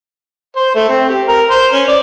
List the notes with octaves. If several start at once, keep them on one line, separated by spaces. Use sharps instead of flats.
C5
A3
C4
G4
A#4
C5
C#4
D5